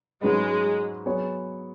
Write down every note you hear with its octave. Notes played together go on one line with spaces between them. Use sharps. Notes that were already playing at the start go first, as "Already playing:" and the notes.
G#2 F#3 G#3 C#4 B4 D#5
F#3 B3 G#4 C#5